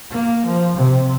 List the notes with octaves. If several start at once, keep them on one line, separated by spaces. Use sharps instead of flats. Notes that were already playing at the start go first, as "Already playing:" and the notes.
A#3
F3
C3